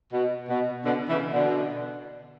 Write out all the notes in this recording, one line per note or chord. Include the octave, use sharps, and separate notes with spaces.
B2
B2
B2 D3
C#3 E3
B2 D3